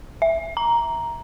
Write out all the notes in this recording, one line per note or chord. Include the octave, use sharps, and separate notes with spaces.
E5
A#5